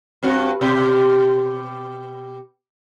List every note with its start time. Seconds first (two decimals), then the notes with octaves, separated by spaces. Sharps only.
0.23 G2 C4 F#4
0.61 B2 G4